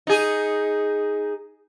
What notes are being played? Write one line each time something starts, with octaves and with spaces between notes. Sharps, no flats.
D#4 G#4